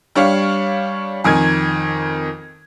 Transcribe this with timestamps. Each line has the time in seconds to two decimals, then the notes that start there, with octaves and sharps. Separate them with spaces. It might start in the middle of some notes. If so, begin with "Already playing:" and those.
0.15 G3 D4 C#5 F5
1.24 F2 D#3 G#5 G#6